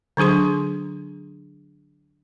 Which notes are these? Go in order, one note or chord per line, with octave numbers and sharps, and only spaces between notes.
D3 F#3 D4 G#4 C6